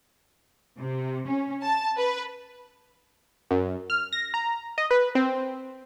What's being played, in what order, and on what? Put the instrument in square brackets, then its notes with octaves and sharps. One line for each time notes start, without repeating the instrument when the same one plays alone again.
[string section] C3
C#4
A5
B4
[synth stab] F#2
F6
A#6
A#5
D#5
B4
C4